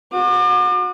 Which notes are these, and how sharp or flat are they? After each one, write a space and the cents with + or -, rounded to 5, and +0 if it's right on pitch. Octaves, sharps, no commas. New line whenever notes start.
F#4 -30 D6 +40